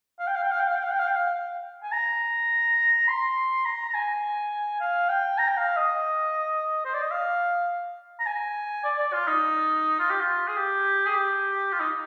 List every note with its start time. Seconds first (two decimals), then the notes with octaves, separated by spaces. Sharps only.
0.19 F5
0.27 G5
0.36 F5
0.43 G5
0.52 F5
0.60 G5
0.68 F5
0.75 G5
0.84 F5
0.92 G5
0.99 F5
1.08 G5
1.16 F5
1.83 G#5
1.92 A#5
3.08 C6
3.65 A#5
3.90 A#5
3.94 G#5
4.81 F5
5.10 G5
5.38 A#5
5.48 G5
5.57 F5
5.77 D#5
6.85 C5
6.94 D5
7.02 D#5
7.11 F5
8.20 A#5
8.26 G#5
8.84 D5
8.99 D5
9.13 F4
9.27 D#4
9.99 F4
10.10 G4
10.20 F4
10.48 G#4
10.57 G4
11.07 G#4
11.14 G4
11.72 F4
11.80 D#4